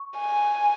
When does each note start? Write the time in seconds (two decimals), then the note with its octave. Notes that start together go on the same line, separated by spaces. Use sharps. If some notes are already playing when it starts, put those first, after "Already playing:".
Already playing: C#6
0.18 G#5